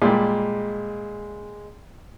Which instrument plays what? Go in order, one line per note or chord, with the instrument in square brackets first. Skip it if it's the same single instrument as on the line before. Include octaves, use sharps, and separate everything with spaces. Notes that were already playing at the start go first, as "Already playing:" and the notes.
[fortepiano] A#2 G3 [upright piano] G#3